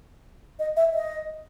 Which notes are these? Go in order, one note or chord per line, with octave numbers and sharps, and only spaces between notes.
D#5
E5
D#5